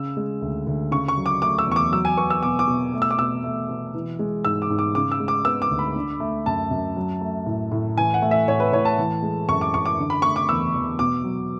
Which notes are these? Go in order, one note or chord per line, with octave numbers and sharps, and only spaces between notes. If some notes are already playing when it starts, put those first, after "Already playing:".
Already playing: C#3 E6
G#3
D2
D2
C#3 C#6
C#6
F#3
D6
A3 D6
E6
E2 C#6
D6
F#3 E6
G#5
B3 C#6
E6
B2 D6
D6
B2
A3
E6
D6
B2 E6
A3
B2
E3
G#3
G#2 E6
D6
G#2
D6
C#3 D6
E6
G#3
D6
B3 E6
D6
D2
B5
D3
A3
F#2 A5
F#2
F#3
A3
A2
A2
E3 G#5
F#5
A3
E5
A2 C#5
B4
A2 C#5
A5
E3
G#3
F#2 C#6
D6
F#2 C#6
D6
D3
B5
A3 C#6
D6
E2 E6
E2
B2 D6
F#3